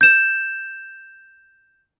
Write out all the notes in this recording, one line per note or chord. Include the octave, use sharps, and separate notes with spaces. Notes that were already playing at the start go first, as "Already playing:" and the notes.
G6 E7